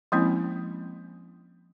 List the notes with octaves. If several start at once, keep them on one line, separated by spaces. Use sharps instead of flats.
F3 G#3 A#3 C4 C#4 E4